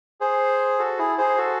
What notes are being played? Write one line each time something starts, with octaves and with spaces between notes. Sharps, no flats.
G#4 C5
F#4 A4
E4 G#4
G#4 C5
F#4 A4